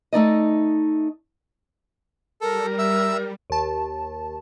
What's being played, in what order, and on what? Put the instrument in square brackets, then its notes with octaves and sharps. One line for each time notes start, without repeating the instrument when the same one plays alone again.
[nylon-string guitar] A3 D#4 D5 D#5
[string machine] G3 [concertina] A4 [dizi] A#4
[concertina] E5 E6
[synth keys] D#2 A5